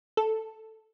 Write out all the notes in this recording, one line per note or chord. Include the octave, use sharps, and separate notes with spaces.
A4